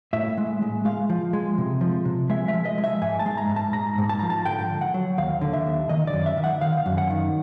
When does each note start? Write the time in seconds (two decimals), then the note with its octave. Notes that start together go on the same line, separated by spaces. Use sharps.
0.13 A2 E5
0.38 G#3
0.62 G#3
0.85 G#3 F5
1.10 F3
1.33 G#3
1.58 C3
1.81 F3
2.05 C3
2.30 G#3 E5
2.48 E5
2.54 F3
2.65 D#5
2.78 G#3
2.84 E5
3.02 G#2 G#5
3.19 A5
3.26 G#3
3.37 A#5
3.50 G#2
3.56 A5
3.73 G#2 A#5
3.98 G#2
4.09 A5
4.19 F3 A#5
4.30 A5
4.45 D3 G5
4.70 D3
4.81 F#5
4.94 F#3
5.18 D#2 F5
5.41 D3
5.53 E5
5.66 D#2
5.89 D#3 D#5
6.07 D5
6.13 F#2
6.26 E5
6.37 D#3
6.44 F#5
6.61 D#3 F5
6.86 F#2
6.98 F#5
7.10 D#3